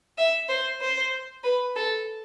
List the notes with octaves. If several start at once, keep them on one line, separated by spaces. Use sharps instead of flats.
E5
C5
C5
B4
A4